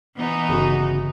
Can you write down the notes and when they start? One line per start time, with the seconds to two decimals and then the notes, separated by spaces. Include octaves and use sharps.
0.17 E3 B3 D#4
0.49 G1 C#3 F#4